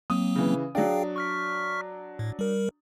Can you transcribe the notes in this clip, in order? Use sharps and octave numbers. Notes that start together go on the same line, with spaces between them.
F#3 A#3 C4 D#6
C#3 E3
F#3 D4 G#4 F5 G5
C#6 F6 B6
A2
G3 A#4